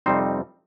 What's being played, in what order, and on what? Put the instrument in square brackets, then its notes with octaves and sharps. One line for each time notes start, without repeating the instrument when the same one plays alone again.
[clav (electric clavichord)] F2 C3 G3 C4 D#4 C5